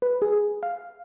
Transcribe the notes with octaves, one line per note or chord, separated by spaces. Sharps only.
B4
G#4
F5